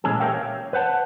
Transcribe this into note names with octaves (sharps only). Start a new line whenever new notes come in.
A#2 E3 G#3 C#4 G#4 A4
G4 A#4 C#5 E5 F5 G5
C#5
B4 C5 F#5 A5